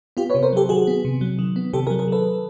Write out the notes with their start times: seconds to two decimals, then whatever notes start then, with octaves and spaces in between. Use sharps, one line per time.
0.17 B3 F4 G4
0.30 B4 C#5
0.35 C3
0.43 A#4 C5
0.53 F#3 G4 A4
0.69 D#3 F#4 G#4
0.87 B3
1.05 C3
1.21 F#3
1.39 D#3
1.56 B3
1.73 C3 G4 A4
1.87 G#4 A#4
1.90 F#3
1.99 G#4 A#4
2.08 D#3 A4 B4